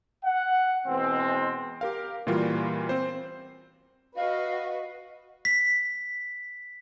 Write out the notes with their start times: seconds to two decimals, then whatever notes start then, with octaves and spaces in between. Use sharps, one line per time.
0.25 F#5
0.87 B2 E3 G#3 C4
1.81 G4 A#4 F5
2.27 A#2 E3 G3 F4 F#4 A#4
2.89 C4 C5
4.15 F#4 B4 D#5 F5
5.45 B6